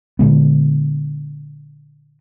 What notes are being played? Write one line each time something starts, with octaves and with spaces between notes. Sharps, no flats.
A#2 D3 G#3 B3